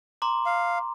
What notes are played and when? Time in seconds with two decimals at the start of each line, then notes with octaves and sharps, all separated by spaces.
0.22 A#5 C6 D6
0.46 F5